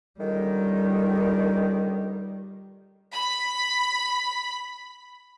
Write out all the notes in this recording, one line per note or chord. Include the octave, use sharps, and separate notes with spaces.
C#2 D3 D#3 G3
B5 B6